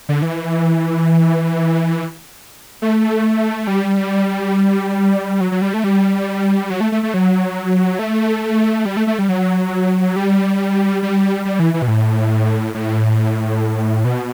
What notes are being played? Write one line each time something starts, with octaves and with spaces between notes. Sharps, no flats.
D3
E3
A3
G3
F#3
F#3
G3
A3
G3
F#3
A3
A3
A3
F#3
A3
G3
A3
A3
G3
F#3
G3
G3
G3
E3
E3
B2
A2
A2
B2